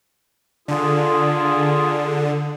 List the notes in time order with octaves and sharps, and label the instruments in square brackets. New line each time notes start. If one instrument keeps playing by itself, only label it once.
[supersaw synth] D3 [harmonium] F4 G#4